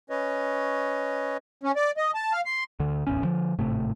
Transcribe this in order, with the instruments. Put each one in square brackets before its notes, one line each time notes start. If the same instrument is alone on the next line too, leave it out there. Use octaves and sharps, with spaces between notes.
[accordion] C#4 B4 C#5 D#5
C#4
D5
D#5
A5
F5
C6
[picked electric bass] D2 D3
D1 A1 E2 C#4
D3 F3
G#1 A2 C3 A3